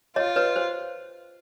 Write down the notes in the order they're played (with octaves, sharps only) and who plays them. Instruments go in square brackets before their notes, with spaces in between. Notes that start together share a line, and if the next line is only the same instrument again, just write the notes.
[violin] F4 [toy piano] C#5 D#5
[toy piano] B4 C#5
C5